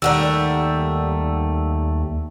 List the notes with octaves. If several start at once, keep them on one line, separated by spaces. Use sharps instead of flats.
D#2 G3 A3 A#4 D5 F#5 E6